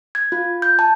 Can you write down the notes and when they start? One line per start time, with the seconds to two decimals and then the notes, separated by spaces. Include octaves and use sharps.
0.15 G#6
0.32 F4
0.62 G6
0.79 A5